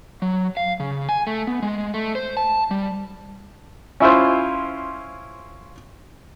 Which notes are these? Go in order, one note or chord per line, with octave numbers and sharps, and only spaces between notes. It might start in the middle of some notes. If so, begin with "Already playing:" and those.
F#3
F5
C#3
G#5
A3
B3
G#3
A3
C5
A5
G3
C#4 E4 F4 C5